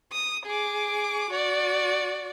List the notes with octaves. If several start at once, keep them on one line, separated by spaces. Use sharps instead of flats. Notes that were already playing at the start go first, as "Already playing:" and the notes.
D#6
G#4 D6
F#4 D5